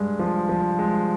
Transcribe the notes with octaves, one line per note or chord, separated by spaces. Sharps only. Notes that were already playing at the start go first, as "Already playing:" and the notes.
Already playing: G2 G#3
F3
F3
G#3